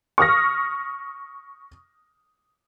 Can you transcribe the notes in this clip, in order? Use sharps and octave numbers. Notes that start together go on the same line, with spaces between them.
C#6 D#6 F6 A#6